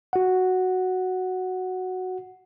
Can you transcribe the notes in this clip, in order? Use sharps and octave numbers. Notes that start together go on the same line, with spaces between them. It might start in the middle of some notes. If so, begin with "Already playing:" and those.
F#4 F#5